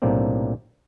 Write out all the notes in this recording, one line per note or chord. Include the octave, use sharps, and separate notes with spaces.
B1 A2 C3 A#3 C4 D4